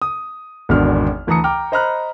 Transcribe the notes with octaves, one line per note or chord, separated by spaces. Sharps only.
D#6
G#1 E2 B2 D3 D4 F6
D2 E3 A5 A#5 D#6 C#7
G5 A#5 D6 F6
C5 D#5 A#5 B5 F6 F#6